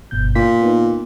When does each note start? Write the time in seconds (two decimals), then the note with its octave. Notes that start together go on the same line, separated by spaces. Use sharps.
0.11 G1 B2 G6
0.35 A#2 B6
0.61 B3 D#4